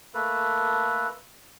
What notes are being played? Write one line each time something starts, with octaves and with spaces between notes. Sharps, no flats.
A3 A#3 A4 B4